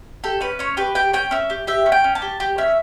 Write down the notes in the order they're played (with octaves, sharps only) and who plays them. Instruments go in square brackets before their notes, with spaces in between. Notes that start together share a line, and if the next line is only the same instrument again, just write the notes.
[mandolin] G4 A4
C#4 B4
C#4 C#5
G4 B4
G4 G5
C#4 G5
C#4 E5
G4
G4 E5
C#4
G5
C#4
A5
G4
G4 G5
C#4 E5